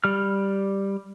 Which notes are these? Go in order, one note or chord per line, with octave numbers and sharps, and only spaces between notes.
G3 F6